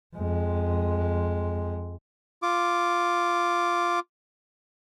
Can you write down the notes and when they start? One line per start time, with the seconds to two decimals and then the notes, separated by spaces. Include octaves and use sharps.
0.15 F2 G#3
2.42 F4 D6